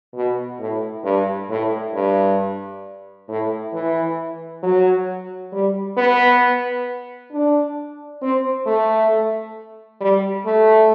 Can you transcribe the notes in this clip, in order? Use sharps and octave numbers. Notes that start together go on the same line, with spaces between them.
B2
A2
G2
A2
G2
A2
E3
F#3
G3
B3
D4
C4
A3
G3
A3